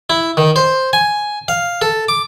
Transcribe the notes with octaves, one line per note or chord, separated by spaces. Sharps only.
E4
D#3
C5
G#5
F5
A4
D6